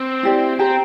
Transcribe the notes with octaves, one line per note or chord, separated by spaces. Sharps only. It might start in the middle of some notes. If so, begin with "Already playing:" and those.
Already playing: C4
E4 G4 D5
C4 G4 C5 G5 A#5